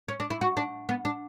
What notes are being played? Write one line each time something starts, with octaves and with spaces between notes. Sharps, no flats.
C#4
D4
E4
F#4
D4
B3
D4